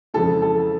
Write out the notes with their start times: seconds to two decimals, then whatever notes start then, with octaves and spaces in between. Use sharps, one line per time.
0.14 F2 C#3 E3 G#3 A4
0.42 A4